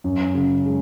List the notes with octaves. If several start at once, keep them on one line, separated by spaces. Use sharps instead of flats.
F#2
C#3
G#3